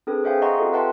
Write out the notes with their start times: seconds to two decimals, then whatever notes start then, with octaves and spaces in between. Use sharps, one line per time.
0.07 C4 D4 G#4 A4 B4
0.24 G#4 C5 E5 F5 G5 G#5
0.42 D#5 F5 F#5 A#5 C6 C#6
0.59 C4 F4 G4 A4
0.72 B4 E5 F#5 G5 A5 C6